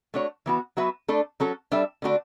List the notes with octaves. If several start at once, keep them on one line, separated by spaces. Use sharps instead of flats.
A3 D4 F#4 C#5
E3 B3 F#4
F#3 B3 F#4 B4 E5
A3 D4 A4
F#3 C#4 F#4 A4
G3 D4 A4 E5
D3 A3 D4 F#4